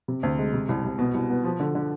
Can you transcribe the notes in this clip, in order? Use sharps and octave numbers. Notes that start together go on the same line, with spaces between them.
C3
D2
G#3
C3
C2
C2
B2
C2
B3
F3
D3
D3